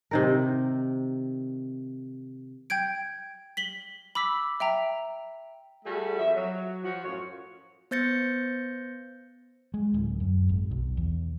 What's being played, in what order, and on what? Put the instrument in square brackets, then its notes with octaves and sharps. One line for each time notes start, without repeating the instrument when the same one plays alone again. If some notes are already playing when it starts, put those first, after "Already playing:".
[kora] C3 D#3 A#4
[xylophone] G5 G6 G#6 D7
B6 F#7 G7
B5 D6 E6 B6
E5 G5 A#5
[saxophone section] G3 A3 F#4 G#4 A4
F2 F3 E5
F#3
F3 F#4
F#2 A2 F4 C#5
[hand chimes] B3 C5 G6 A6 A#6 C#7
[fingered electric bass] G#3
D1
F#2
G#1
B1
E2